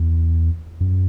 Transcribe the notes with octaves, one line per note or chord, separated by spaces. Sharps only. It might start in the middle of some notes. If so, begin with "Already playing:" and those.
Already playing: E2
F#2